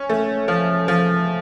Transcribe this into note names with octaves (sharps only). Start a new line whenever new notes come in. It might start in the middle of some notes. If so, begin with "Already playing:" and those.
Already playing: C#4
A3
F3
F3